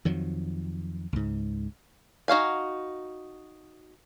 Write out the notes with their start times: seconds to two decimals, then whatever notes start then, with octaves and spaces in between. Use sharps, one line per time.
0.05 F2 D#3 F3 F#3
1.13 C#2 G#2
2.28 D#4 F#4 F5 G#5